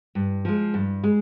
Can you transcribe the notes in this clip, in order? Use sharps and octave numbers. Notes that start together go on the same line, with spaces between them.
G2
F3 G#3
G2
G#3